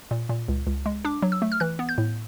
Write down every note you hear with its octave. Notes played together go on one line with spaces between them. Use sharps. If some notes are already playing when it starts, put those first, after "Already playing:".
A#2
A#2
C#2
C#2
G#3
D4 D6
F#3
E6
A3
F6
E3 F#6
B3
G6
A2